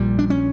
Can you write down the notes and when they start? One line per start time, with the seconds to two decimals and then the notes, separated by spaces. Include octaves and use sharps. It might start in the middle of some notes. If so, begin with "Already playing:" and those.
Already playing: A#1 A#2 G3
0.19 D4
0.30 C#4